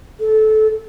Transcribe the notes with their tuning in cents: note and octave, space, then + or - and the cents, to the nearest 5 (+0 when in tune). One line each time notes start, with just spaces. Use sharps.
A4 -20